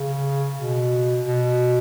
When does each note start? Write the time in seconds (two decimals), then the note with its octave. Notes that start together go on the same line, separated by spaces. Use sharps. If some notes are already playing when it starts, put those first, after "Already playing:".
Already playing: C#3
0.57 B2
1.25 B2